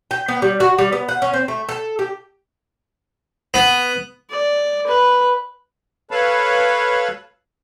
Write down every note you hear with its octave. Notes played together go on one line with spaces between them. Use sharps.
G5
B3
G3
F#4
G3
B3
F#5
C#4
C4
A3
A4
G4
B3
D5
B4
A4 B4 C#5 F5 A5 B5